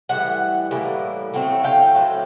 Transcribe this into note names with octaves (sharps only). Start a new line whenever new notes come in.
A2 E3 G3 F#5
A2 E3 G3 A#3
A2 F#3 A3 C4
F5 G5
A2 F#3 A3 C4